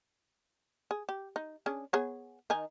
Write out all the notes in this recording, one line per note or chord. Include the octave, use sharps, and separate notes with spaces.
G#4
G4
D#4
C#4 D4 G#4
B3 G#4 C#5
D#3 D#4 G#5